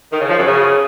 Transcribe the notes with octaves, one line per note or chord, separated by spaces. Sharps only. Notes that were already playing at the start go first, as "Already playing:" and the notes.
D#3
C#3
F3
F#2
C#3